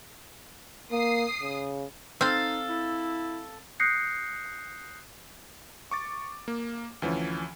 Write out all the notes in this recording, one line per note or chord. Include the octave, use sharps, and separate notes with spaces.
A#3 D#6 C7
C#3
C4 D#4 A4 F5
E4
D#6 F#6 G6 A#6 C7 C#7
C#6 D6 A6
A#3
D2 E3 F3 C#4